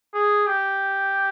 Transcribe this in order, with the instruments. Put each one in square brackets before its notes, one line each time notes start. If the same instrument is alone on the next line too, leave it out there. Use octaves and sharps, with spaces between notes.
[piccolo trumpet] G#4
G4